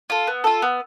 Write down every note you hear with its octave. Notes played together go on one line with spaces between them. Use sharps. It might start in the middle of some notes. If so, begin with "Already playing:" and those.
F4 A4
B3
F4 A4
B3